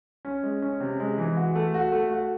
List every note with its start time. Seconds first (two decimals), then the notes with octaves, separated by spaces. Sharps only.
0.25 C#4
0.43 G#3
0.62 C#4
0.81 C3
1.00 G#3
1.18 E3
1.37 F#4
1.55 A3
1.74 F#4
1.92 A3
2.11 F#4